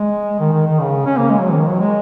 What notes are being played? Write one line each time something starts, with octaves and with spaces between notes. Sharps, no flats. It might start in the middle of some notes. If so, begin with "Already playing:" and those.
Already playing: G#3
D#3
D#3
D#3
C#3
C#4
A#3
G#3
F#3
D#3
F#3
G#3